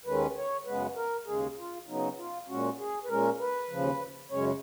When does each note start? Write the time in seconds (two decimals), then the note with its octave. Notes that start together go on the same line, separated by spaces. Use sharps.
0.05 D#2 D#3 G#3 C#4 B4
0.36 C#5
0.65 F#2 C#3 G#3 B3 B4
0.96 A#4
1.26 D#2 C#3 G#3 G#4
1.57 F4
1.88 C#3 F#3 B3 D#4
2.17 F4
2.48 A#2 G#3 C#4 F#4
2.78 G#4
3.04 B4
3.09 A#2 G#3 C#4 A#4
3.40 B4
3.69 D#2 C#3 F3
4.30 F#2 C#3 G#3 C#4 C#5